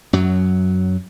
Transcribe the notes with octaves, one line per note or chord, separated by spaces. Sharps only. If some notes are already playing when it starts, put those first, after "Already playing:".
F#2 F#3